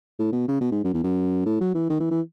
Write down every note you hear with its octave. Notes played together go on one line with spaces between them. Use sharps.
A2
B2
C#3
B2
G#2
F#2
E2
F#2
A2
F#3
E3
D#3
E3
E3